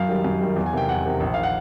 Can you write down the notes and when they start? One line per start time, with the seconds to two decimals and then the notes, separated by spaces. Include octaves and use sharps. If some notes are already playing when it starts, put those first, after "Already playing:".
Already playing: F#2 F5
0.09 D#3 G3
0.24 F#2
0.41 D#3 G3
0.56 E2
0.66 G#5
0.73 C3 D#3 G5
0.89 E2 F#5
1.05 C3 D#3
1.20 A#1
1.34 D#3 F5
1.43 F#5